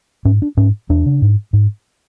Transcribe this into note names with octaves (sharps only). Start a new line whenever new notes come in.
G#2 C#4
D4
G#2 C#4
E2 D4
C#3
G#2
G#2